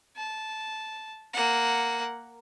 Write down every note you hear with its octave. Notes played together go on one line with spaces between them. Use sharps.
A5
A#3 F#5